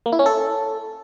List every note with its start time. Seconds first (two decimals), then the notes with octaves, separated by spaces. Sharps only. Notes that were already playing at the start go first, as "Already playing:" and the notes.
0.06 A#3
0.12 E4
0.19 C#4
0.26 A4